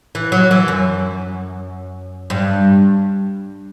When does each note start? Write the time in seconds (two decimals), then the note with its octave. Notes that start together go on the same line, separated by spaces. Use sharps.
0.15 E3
0.32 F#3
0.51 E3
0.68 F#2
2.30 G2